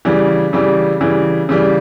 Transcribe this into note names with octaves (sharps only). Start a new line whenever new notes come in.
C#3 E3 G3
C#3 E3 G3
C#3 E3 G3
C#3 E3 G3